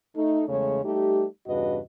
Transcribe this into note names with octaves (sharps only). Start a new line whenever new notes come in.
A3 D#4
E2 C#3 G#3 A3 C#5
G3 A3 D#4 G4
E2 G2 C#3 F#4 B4 D#5